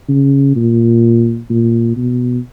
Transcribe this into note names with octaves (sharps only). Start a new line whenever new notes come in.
C#3
A#2
A#2
B2